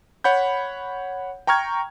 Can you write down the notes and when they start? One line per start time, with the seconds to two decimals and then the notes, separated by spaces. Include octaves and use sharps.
0.24 C#5 F#5 B5 G6
1.47 G5 A#5 C#6 F6 G#6